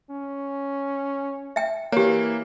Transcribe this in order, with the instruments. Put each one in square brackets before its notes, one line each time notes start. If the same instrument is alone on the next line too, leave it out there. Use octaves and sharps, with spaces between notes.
[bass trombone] C#4
[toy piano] E5 G5
[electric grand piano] E3 A#3 [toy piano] G4 C#5